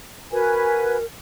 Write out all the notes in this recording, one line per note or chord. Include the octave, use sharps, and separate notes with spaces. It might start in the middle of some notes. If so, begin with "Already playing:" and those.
F#4 A#4 B4 G#5